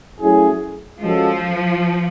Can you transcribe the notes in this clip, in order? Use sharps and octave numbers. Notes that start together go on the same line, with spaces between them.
F#3 A3 C#4 E4 G#4
F3 G#3 C#4 F#4 A4